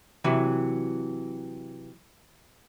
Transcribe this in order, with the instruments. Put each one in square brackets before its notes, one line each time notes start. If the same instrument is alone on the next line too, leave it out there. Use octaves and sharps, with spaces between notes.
[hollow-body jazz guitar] C3 E3 F#3